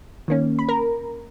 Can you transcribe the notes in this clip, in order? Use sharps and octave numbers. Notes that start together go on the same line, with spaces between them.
D#3 A#3 C#4
B5
A#4 A#5